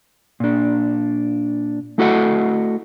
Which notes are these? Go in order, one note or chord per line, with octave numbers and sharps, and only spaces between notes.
A#2 D4
A3 E4 F#4 A4 D#5 F#5